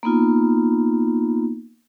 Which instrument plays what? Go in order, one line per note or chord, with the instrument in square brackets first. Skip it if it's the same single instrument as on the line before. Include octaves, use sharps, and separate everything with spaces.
[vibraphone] A#3 B3 D#4 F4